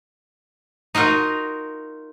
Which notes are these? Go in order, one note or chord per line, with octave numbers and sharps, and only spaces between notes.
D#4 F4 F#4 A#4